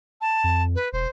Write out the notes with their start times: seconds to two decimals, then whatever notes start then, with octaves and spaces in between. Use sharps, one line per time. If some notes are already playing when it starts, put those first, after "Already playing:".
0.21 A5
0.44 F2
0.75 B4
0.93 E1 C5